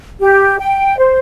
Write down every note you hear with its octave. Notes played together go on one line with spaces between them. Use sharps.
G4
G5
C5